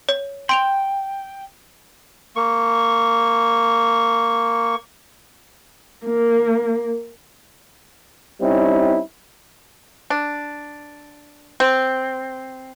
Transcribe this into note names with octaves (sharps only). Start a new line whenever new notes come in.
C#5
G5 C6 D7 F7
A#3 C#6
A#3
G3 C4 C#4 D#4 E4
D4
C4